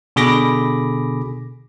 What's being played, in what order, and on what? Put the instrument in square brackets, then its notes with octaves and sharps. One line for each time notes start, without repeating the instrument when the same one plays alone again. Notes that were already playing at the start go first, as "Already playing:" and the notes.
[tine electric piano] B2 D3 G#4 B5 D6 A#6